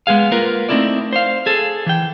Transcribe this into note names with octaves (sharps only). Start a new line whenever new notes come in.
G#3 B3 G#4 F5
A#3 F4 A#4 B4
A3 C4 D#4 E4 A4 D5
C5 F5
G#4 A4
E3 G5